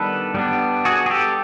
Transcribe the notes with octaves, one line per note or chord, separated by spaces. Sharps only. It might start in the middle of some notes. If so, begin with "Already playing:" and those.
Already playing: D#3 G3 B3 D4 A4 B4
G3 B3 D4
F#4 G#4
G#4
G4 A4